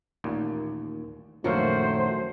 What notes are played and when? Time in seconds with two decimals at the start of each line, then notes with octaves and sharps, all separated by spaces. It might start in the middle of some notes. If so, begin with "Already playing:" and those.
0.24 A1 D#2 A#2
1.44 A#1 F#2 A2 D#3 A3 F#4 C5 F5